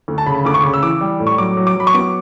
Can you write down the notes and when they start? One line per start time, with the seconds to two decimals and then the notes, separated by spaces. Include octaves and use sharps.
0.08 D2
0.18 A5
0.26 C#3 B5
0.45 D2 D6
0.54 C#6
0.63 C#3
0.74 E6
0.82 E3 D6
1.01 G3
1.20 A2
1.27 C#6
1.38 F#3 D6
1.57 F#3
1.67 D6
1.76 F#3 B5
1.87 C#6
1.94 B3 D6